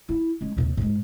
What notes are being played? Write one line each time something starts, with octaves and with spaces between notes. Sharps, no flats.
E4
G#3 C#4
D#2 C3
G#2 G#3